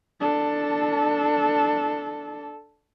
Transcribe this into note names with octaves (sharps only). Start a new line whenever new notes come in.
D4 A4